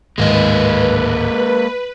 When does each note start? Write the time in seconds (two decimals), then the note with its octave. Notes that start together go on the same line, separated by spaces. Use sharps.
0.18 D1 G#2 D#3 G#3 A#3 B4 D#5